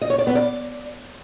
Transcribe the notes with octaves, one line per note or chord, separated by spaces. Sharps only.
D#5
C#5
D5
B3
D5